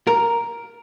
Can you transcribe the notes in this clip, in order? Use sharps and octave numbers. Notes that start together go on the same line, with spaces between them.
A#4